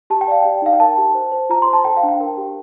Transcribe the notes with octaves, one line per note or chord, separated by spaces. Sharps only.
G4 A5
G5
D5 F5
G4 G5
D#4 F5
G5
A#4 A5
G4
C5
C5
F4 A#5
C5 C6
A5
A4 G5
F5
D4
G5
A#4
G4